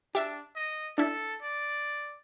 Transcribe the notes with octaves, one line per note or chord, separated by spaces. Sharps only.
D4 G4 E5 E6
D#5
D4 E4 A4
D5